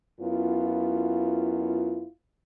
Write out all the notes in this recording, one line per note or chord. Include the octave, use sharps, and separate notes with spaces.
F#2 B3 E4 F4